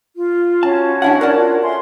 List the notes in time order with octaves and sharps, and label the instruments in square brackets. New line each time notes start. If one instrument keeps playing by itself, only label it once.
[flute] F4
[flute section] C#4 F#4 [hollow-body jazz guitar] A5
[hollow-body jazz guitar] D4 E4 F#5 [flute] A5
[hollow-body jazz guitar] A#4 F#5 A5 [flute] D5
[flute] F4
[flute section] A4 E5 G#5 [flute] C6